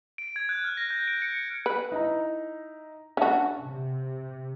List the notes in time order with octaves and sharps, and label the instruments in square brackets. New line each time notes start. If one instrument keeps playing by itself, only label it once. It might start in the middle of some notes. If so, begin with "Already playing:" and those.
[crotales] D7
G#6
F#6
F6
A#6
G6
D7
C#7
C#7
[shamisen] B4
[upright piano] D#4 E4 A#5
[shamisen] C#4 F#4 [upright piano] D4 E5 A5
[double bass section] C3